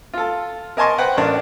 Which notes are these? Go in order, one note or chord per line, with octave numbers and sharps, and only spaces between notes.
F4 A4
A#4 D#5 G#5 A5 C6 C#6
B4 C5 F#5 G5
A1 D4 A#4